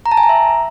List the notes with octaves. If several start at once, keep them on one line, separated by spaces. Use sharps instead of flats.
A#5
A5
G#5
A#5
E5